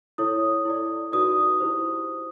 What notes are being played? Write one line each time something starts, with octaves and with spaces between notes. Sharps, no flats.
E4 A4 C#5 D#6
E4 A4 D5
D#4 F#4 B4 D5 D#6
E4 G4 C5